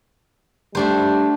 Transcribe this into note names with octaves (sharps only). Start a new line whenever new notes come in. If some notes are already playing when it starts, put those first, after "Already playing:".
G3 A3 D4 C5